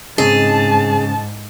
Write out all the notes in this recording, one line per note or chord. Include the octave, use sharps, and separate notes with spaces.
G#2 C#3 C4 D#4 G#4 A5